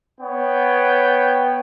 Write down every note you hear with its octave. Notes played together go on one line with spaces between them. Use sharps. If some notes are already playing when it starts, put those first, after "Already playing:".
B3 C#5 G5